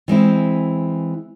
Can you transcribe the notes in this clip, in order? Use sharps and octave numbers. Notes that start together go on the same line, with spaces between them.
E3 G#3 C4 E4